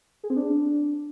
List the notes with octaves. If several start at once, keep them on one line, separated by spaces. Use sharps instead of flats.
G#4
C4
D4